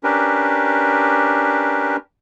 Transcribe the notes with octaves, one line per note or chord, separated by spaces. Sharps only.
C#4 D4 G4 A#4 B4